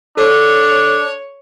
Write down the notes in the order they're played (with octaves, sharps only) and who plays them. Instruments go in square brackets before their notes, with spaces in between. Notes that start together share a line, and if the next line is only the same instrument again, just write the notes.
[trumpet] D4 [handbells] A4 [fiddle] C#5